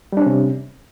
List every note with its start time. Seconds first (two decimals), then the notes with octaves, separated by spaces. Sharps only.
0.12 G3
0.17 D4
0.22 C#4
0.26 C3